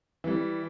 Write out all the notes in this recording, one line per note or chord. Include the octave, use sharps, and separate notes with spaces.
E3 G3